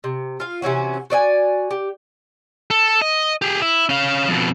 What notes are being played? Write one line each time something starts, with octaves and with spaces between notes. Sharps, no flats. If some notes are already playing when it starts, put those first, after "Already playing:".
C3
F4 F5
C3 E3 C#4 F#4
F#4 D5 D#5 G#5
G4
A4
D#5
G4 G#4
E4
C#4 F5
F2 B2